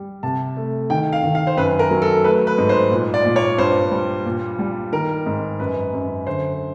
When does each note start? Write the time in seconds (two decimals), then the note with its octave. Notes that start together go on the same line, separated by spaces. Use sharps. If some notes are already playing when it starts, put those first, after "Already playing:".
Already playing: G3
0.23 C3 A5
0.57 A3
0.90 D#3 G5
1.13 F5
1.23 D#3
1.35 F5
1.47 C5
1.57 F#2 B4
1.79 A#4
1.91 F#3
2.02 A4
2.24 A3 B4
2.47 B4
2.58 G#2
2.69 C5
2.91 A#2
3.14 D5
3.25 A#2
3.36 C#5
3.58 G2 C5
3.91 G3
4.25 A#2
4.59 G3
4.92 D#3 A#4
5.26 G#2
5.60 F#2 B4
5.93 F#2
6.26 D3 C5